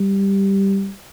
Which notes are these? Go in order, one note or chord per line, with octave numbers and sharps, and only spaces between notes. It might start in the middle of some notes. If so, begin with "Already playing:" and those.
Already playing: G3